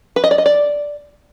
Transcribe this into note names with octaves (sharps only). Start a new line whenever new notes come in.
B4
D#5
D5
D#5
D5